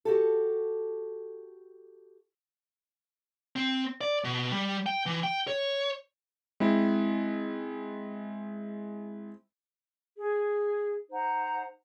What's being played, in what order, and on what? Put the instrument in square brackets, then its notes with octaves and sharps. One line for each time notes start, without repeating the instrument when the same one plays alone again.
[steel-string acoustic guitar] F#4 G4 A4
[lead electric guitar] C4
D5
B2
G3
G5
E3
G5
C#5
[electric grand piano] G#3 C4 E4
[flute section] G#4
D#4 C5 F#5 A#5